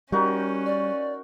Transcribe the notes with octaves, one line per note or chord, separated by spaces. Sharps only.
G3 C#4 D#4 F#4 A#4
D5